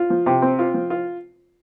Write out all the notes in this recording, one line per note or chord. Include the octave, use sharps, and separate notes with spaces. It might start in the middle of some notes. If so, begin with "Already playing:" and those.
Already playing: F4
F3
C3
C4
F4
F3
F4